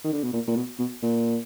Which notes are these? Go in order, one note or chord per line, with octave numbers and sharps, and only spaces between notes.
D#3
D3
B2
A#2
A#2
B2
B2
A#2